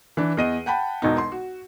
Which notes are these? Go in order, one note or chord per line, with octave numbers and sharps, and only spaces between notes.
E3 D4
E2 D#5 D#7
F#5 G5 A5 B5
E1 B1 B2 D#4
C6
F#4